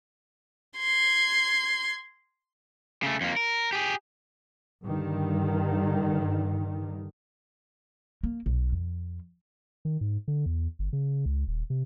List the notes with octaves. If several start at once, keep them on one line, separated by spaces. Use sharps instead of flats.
C6 G#6
C#3 A3
F2 A#3
A#4
G4 G#4
G2 D3 D#3
A#3
B1
F2
D#3
G#2
D3
E2
G1
C#3
C#2
D#1
C3